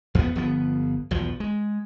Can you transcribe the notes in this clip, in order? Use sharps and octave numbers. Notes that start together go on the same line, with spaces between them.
E2 F3 G3 B3
G1 F3 B3
B1 E2 F3
G#3